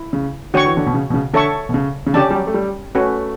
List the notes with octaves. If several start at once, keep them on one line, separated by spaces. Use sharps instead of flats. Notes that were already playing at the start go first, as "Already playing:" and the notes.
Already playing: E4
C#3
D3 F#4 C#5 G5 C#6
E3
D3
B2
C#3
B2
C#3
D3 A4 C#5 E5 A5 C#6
B2
C#3
C#3
D3 C#4 G4 D5 A5
G3
F#3
A3
G3
A3 C#4 F#4 B4